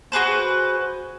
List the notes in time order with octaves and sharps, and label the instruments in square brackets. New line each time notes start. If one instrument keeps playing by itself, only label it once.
[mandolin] F#4 G#4 B4 C5